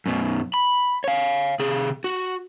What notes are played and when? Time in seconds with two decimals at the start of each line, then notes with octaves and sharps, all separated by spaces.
0.06 F#2 B2
0.54 B5
1.04 C#5 F5
1.59 C3 G#4
2.04 F#4